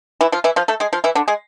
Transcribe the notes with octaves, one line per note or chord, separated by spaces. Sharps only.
E3 E4
F3 F4
E3 E4
F3 F4
A3 A4
G#3 G#4
F3 F4
E3 E4
D3 D4
G#3 G#4